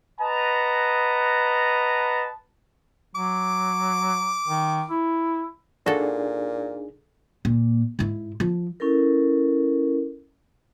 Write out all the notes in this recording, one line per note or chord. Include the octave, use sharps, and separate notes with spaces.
B4 D#5 F#5 A5 A#5
F#3 D6
D#3
E4
A#2 D4 D#4 F#4 G#4 A4
A#2
G#2 E4
F3
C#4 E4 A4 A#4